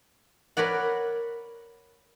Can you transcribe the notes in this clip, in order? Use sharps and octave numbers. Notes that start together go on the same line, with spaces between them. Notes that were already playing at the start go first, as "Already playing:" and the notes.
A#4 B4 C#5 D5 F#5